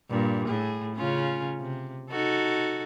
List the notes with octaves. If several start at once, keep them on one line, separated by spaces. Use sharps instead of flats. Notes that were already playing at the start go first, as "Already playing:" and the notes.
G2 A#2
A2 G#4
C#3 C#4 F4
C3
D#4 F#4 A4